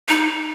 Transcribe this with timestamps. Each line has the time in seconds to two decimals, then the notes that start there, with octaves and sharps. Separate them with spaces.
0.09 D#4